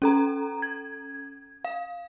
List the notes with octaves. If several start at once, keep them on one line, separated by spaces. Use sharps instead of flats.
C#4 A4 A#5
G#6
F5